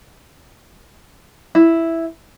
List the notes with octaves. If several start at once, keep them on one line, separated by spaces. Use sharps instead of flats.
E4